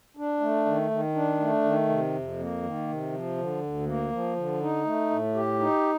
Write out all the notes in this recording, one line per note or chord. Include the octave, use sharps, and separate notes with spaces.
D4
A3
D#3
D#3
D4
A3
D#3
C3
F2
A#3
D#3
C3
F3
D3
D2
A#3
F3
D3
D#4
A3
A2
G4
D#4